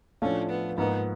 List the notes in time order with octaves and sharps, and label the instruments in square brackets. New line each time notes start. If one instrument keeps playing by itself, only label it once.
[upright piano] A2 F3 A3 D4 F4 [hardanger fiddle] C#4
[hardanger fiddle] B3
[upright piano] G#2 F3 A#3 D#4 [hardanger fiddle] B3